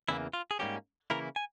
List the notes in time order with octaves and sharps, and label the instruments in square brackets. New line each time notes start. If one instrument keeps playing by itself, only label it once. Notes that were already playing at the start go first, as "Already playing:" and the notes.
[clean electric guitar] E2 C#3 E3 G3 A#3 E4
F4
G#4
G#2 G3 A#3 C#4 G4
C#3 E3 A#3 E4 A#4
G#5